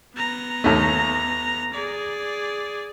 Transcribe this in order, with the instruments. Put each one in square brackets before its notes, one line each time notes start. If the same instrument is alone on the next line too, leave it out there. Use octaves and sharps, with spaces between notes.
[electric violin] B3 A#5
[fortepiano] D#2 A3
[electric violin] G#4 D5